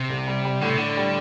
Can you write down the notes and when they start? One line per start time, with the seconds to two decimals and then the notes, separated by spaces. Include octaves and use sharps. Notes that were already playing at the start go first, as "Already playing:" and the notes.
Already playing: C3
0.10 C2
0.27 G3
0.45 G3
0.61 A2 D3
0.69 C3
0.77 A2 D3
0.97 G3